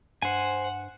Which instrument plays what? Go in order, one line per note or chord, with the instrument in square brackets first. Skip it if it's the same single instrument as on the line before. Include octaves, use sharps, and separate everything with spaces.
[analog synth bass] G2 [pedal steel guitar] C5 G#5 [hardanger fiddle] F#5